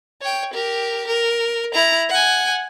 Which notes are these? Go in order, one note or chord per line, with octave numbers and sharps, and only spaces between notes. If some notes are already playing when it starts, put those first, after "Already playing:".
C#5 G5
G4 A#4
A#4
E4 A#5
F#5 G#5